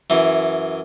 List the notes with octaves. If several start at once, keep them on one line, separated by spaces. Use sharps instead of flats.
F#2 E3